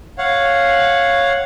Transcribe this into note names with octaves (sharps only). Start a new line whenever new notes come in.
C#5 F5 F#5